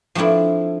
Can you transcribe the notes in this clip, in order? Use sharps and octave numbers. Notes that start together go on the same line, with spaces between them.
F3 A3 C4 D4 E4